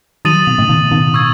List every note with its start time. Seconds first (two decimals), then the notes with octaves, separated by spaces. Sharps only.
0.25 D#3 F#3 D#6 A6 D#7 F#7
0.47 B2
0.58 A2 C#3
0.69 B2 D#3
0.91 B2 D#3
1.14 C#6 E6 G#6